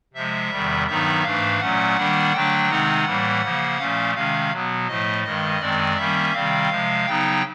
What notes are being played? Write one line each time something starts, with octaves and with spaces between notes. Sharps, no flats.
C3 F3 G#3 E5
E2 C3 D#3 G3
G2 D#3 F#3 B3 D#4 E5
G#2 E3 A3 D4 F5
A#2 F#3 A3 C#4 F#5
D#3 G3 A#3 D4
D3 F#3 A3 D4 G5
C3 D#3 G#3 C4 D#4 F#5
A2 E3 G3 A#3
C#3 F3 A#3
A#2 F3 A3 C#4 F5
C3 D#3 G#3 C#4 F5
B2 F#3 B3
A2 F3 A3 D#5
G2 D#3 G#3 D#5
F#2 D#3 G#3 C4 D5
D#3 G3 A#3 C#4 E5
C3 D#3 G3 C4 F5
C3 F3 G#3
C#3 F#3 B3 D#4 G5